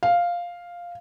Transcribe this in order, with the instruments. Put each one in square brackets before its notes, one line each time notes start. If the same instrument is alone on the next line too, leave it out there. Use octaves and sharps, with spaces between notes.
[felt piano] F5